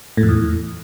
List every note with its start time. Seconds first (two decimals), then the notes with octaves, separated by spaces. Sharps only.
0.17 A2
0.23 F2
0.29 E2